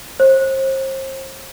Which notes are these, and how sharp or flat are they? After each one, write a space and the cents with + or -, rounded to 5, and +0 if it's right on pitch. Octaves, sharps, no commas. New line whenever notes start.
C5 +35